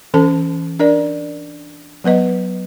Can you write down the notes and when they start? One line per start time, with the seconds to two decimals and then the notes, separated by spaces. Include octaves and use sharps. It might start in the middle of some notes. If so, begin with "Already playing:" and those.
0.14 E3 C#4 A4 A5
0.79 D4 A#4 D5
2.04 F#3 B3 B4 D#5